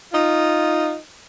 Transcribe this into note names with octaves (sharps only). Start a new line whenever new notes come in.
D#4 F4